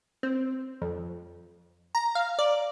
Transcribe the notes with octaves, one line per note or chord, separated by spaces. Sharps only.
C4
F2
A#5
F5
D5